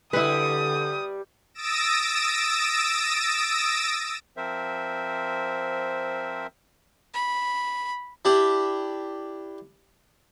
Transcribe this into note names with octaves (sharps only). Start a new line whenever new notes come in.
D3 G3 E4 B4 D#6
D#6 E6 A6 A#6 D7 E7
F3 C4 A#4 C5 E5
B5
D4 E4 G4